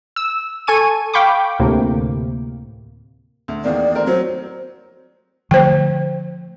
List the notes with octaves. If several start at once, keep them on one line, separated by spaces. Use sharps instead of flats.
E6
A4 G#5 C#6 D#7
F5 G5 B5 C#6 D6
D2 A2 C3 A#3
D2
E2 D#3 A#3 D5
A3 C4 A#4
F#3 C5
D3 F3 A3 C5 G5